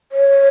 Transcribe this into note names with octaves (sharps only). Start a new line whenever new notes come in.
C#5